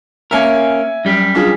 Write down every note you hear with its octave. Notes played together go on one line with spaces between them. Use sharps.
A#3 C#4 A#4 E5 G#5
F#2 G3
D4 F4 G#4